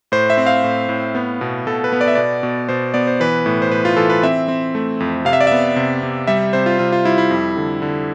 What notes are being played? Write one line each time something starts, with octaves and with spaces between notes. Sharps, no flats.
A2 C5
E5
C4
F5
A2
A2
B3
B2
B2 A4
B4
B3
D5
E5
B2 D5
B2
B2 C5
B3 D5
C5
E3 B4
A2
C5
A2 B4
F4
E3 A4
B4
C4 E5
C4
A3
F2
C3 F5
E5
D5
B3 E5
C3
C3
G3 E5
C3 C5
F4
C3 F4
F4
G3 E4
E4
F2
D3
D3